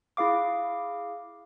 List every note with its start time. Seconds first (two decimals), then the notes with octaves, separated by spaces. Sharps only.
0.17 E4 G#4 F5 D6